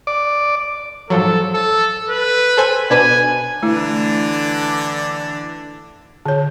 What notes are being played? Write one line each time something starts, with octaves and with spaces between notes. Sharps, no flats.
D5
G#2 F3 F#3 A4
A4
B4
A4 C5 G#5
B2 D4 B4 G#5
D3 E3 A3 D4 E4
D3 C#5